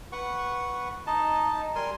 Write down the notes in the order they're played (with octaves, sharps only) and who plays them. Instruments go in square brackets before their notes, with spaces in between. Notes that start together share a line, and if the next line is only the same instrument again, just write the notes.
[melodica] B4 F#5 C#6
D#4 D#5 A5
G3 A#4 G#5 C6